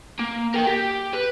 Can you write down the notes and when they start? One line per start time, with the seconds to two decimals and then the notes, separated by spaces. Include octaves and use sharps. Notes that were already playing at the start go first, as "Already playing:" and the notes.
0.19 A#3
0.54 A#4 G5
0.67 G4
1.13 B4